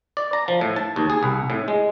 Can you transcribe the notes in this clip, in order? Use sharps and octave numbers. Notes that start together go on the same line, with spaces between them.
D5
A#5
F3
A2
A5
D#2
G#4
C2
A2
G#3